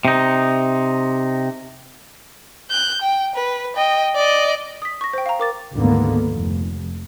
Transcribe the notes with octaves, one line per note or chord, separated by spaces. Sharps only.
C3 D#4
F#6 G6
G5
B4
D#5 G5
D5 D#5
D#6 B6
C#6 A#6
C5 G5
F5 A#5
A#4 D6 A6
D2 G#2 D3 D#3 A#3 B3
F1